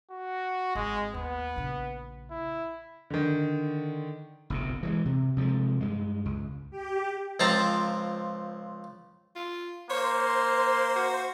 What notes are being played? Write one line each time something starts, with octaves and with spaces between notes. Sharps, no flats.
F#4
G#1 G#3
D#2 B3
A#1 C#3
E4
D3 D#3
F#1 B1 C3
E3 G3 G#3
C3
C3 F3 F#3 G#3
G2 G#3
C#2
G4
C#2 F3 C4 A5 A#5 C6
F4
A#3 C5 C#5
C6
F#4